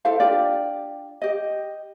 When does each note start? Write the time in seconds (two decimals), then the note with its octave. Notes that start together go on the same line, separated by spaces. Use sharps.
0.05 E4 A4 C5 F5
0.20 D4 F4 G4 D5
1.22 G4 D#5